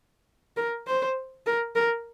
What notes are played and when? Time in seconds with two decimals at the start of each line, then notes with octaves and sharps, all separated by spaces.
0.57 A#4
0.87 C5
1.46 A#4
1.75 A#4